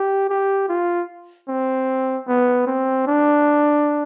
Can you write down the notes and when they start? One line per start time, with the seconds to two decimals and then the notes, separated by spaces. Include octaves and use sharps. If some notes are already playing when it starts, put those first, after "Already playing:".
Already playing: G4
0.29 G4
0.69 F4
1.48 C4
2.28 B3
2.67 C4
3.07 D4